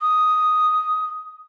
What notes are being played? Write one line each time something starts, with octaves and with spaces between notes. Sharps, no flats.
D#6